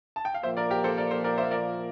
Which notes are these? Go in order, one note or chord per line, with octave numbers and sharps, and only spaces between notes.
A5
G5
F5
A#2 F3 A#3 C5 E5
A#4 D5
G4 A#4
A4 C5
A#4 D5
A4 C5
A#4 D5
C5 E5
A#4 D5